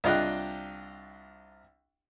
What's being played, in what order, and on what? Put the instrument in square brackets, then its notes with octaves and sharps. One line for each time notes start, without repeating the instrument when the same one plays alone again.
[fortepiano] C2 D4 F4 D#5 G5 F#6